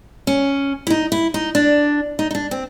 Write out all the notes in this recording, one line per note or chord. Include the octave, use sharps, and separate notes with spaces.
C#4
E4
D#4
E4
D#4
D4
D#4
D#4
D4
C4